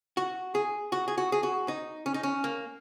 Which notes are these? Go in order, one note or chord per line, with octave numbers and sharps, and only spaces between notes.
F#4
G#4
F#4
G#4
F#4
G#4
F#4
D#4
C#4
D#4
C#4
A#3